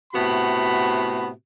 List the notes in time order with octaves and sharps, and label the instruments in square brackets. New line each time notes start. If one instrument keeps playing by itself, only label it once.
[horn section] A2 C3 B3 F#4 B5